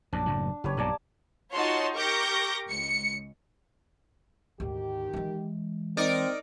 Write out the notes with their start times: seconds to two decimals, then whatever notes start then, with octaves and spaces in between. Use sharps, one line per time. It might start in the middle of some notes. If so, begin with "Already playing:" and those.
0.13 A#1 F#2 D4
0.26 F#1 A2 F#3
0.64 F#1 G4 B4 C#5
0.77 B1 G2 A#2 A#3 D5 A5
1.54 D#4 F4 F#4 C#5 A5 C6
1.95 G4 A#4 C#6 D6 G6 A#6
2.69 C#2 C#7
4.60 D2 G#2 D#3 G4
5.13 E3 G#3
5.97 C4 D#4 A#4 D5